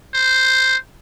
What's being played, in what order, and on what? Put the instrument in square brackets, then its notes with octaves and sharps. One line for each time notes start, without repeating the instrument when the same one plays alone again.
[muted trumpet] C5